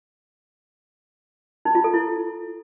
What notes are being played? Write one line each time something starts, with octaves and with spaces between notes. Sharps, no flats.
D#4
F4
A4
E4